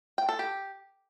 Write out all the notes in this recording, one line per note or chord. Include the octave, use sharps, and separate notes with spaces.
G5
A4
G4